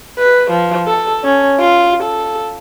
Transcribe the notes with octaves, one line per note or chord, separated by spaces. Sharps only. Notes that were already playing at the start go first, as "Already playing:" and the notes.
B4
F3
A4
C#4
F4
A4